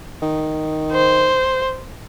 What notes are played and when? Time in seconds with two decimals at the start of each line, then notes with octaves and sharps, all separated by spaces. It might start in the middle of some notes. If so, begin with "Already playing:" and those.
0.23 D#3
0.91 C5